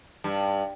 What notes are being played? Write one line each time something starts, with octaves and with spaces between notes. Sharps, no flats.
G2